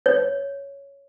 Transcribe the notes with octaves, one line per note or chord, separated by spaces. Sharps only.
C#5